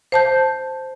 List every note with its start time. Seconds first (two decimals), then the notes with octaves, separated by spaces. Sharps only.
0.12 C5 A5 G6